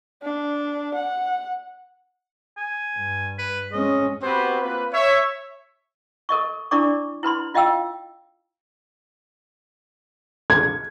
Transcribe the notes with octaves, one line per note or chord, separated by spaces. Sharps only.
D4
F#5
G#5
G2
B4
G#3 C#4 D#5
B3 C4 F#4 G4 B4 C5
A#3 C4 F4 B4
C#5 E5
A4 A#4 D#5 C#6
D4 E4 A#4 D5 C#6 D6
E4 B4 B5 C6
F4 D#5 F5 G5 E6
G#6